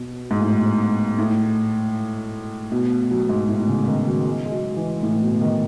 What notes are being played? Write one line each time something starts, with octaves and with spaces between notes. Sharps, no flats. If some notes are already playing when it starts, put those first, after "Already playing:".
Already playing: B2
G#2
A2
A2
B2
F#3
G#2
A2
C#3
D#3
F#3
G#3
G#3
F#3
E3
A2
B2
D#3